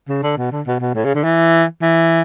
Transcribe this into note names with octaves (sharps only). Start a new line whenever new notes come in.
C#3
D3
B2
D3
B2
B2
A2
C#3
D3
E3
E3